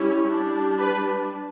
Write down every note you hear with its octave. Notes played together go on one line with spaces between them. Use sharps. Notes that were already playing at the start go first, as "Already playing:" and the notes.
Already playing: G3 C#4 E4
G3 D4
B4